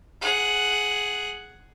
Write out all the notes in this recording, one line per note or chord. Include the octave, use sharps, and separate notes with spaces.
G#4 F#5